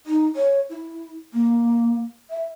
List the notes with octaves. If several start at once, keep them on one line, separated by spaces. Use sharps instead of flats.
D#4
C#5
E4
A#3
E5